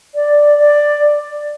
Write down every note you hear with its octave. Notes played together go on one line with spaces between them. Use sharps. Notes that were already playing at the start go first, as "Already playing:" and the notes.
D5
D5